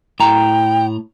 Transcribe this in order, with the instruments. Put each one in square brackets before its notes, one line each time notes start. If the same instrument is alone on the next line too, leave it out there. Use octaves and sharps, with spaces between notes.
[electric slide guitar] A2 A#5 [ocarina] G5